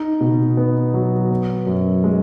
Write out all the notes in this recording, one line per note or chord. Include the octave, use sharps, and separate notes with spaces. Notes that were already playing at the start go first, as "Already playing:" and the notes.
Already playing: D#4
B2
B3
F#3
B3
F#2
G#3